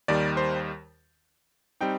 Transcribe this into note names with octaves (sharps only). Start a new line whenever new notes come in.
D#2 D#3 G3 D5
C5
G3 C4 D#4 G5